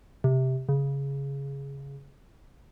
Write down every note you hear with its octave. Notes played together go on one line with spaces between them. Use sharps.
C3
C#3